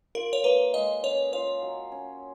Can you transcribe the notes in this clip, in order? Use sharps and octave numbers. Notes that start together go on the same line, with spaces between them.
F4 A#4
C#5
A#3 B4
G#3 D#5
C#4 C#5
F4 C#5
F#3
C#4